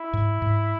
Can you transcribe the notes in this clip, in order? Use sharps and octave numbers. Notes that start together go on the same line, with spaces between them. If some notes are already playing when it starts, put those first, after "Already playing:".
Already playing: E4
G#2
G#2